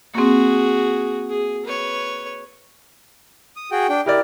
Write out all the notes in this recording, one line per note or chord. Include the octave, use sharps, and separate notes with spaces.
A#3 C4 F#4 G#4
G#4
B4 C#5
D#6
F#4 G#4 G5
D4 G5
E4 G4 A#4 D5